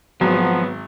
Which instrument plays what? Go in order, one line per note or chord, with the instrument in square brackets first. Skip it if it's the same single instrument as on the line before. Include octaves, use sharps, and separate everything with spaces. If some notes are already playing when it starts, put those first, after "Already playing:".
[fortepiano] G#1 [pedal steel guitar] F3 [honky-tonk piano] F#3 [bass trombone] B3